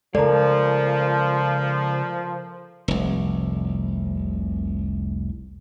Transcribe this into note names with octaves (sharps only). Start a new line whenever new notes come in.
C#3 F3 G#3 A4 A#4 D5 A#5
F1 C2